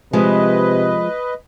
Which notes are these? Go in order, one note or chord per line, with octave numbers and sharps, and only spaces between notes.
C3 F3 G#3 B4 D#5